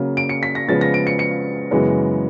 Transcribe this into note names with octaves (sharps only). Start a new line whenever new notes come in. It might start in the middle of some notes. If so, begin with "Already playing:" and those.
Already playing: C#3 F#3 A#3
D7
C#7
B6
A#6
C#3 F3 G#3 B3 A6
A#6
D7
C#7
C#7
F#2 C#3 E3 G#3 B3